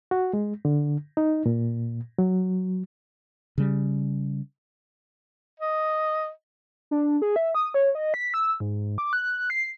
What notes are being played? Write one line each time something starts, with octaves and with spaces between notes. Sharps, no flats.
F#4
G#3
D3
D#4
A#2
F#3
C#3 G3
D#5
D4
G#4
E5
D#6
C#5
D#5
B6
E6
G#2
D6
F#6
C7